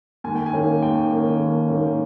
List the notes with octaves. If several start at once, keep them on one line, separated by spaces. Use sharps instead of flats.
D#2 G#5
G5
G#5
D#3 A#3 C#4
D#2 G5
D#3 A#3 C#4
D#2
D#3 A#3 C#4